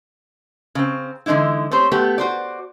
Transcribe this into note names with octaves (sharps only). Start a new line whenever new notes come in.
C#3 C4
D3 E3 G#3 D#4 E4
A3 C4 G4 C5 C#5
A3 B3 G4
F#4 C5 D5